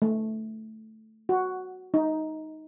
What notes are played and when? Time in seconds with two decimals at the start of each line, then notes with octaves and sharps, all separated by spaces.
0.02 A3
1.29 F#4
1.94 D#4